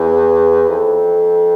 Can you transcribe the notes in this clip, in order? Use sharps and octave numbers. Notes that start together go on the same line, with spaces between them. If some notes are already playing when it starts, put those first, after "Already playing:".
Already playing: E2
F2